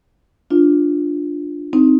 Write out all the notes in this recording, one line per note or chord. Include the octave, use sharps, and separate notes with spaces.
D4 F4
C4 D#4